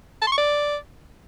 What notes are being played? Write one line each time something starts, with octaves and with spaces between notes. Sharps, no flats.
A5
C6
C#6
D5